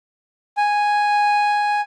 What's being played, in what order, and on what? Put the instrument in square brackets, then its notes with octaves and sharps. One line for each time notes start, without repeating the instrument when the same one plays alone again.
[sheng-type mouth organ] G#5